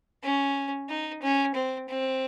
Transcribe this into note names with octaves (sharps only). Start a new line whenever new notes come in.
C#4
D#4
C#4
C4
C4